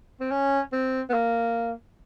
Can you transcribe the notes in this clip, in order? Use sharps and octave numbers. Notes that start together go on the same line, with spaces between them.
C4
C#4
C4
B3
A#3